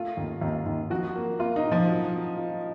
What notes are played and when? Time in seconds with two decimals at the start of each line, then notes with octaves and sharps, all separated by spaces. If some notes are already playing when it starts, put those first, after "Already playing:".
Already playing: A3 F4
0.17 D#2
0.41 D#2
0.66 D#2
0.90 F3 F#4
1.15 A#3
1.39 A#3 F4
1.56 D#4
1.65 A2
1.72 F3
1.88 F#3
2.13 F#3
2.37 F4